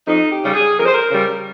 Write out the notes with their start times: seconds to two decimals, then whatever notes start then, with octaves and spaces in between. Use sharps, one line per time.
0.07 F2 D#4
0.31 G4
0.43 C#3 G3
0.54 G#4
0.77 F2 A#4
0.86 C5
0.94 A#4
1.11 C#3 G3